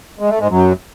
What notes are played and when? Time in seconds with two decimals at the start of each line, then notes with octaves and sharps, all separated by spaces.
0.19 G#3
0.29 A3
0.40 G#2 G#3
0.50 F#2 F#3